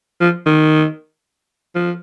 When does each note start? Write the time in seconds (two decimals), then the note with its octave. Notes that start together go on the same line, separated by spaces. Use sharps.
0.21 F3
0.46 D#3
1.75 F3